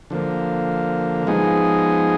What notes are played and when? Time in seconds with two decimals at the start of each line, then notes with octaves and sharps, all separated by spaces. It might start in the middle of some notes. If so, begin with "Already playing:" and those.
0.10 D3 F3 A#3
1.27 F3 G#3 B3 D#4 G#4